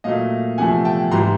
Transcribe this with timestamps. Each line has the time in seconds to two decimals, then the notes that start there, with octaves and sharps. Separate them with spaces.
0.04 A#2 F#3 A3 D#5 F5
0.58 E2 C3 F3 A3 F#5 G#5
0.85 G5 A5
1.11 G#2 E3 G3 A#5 C6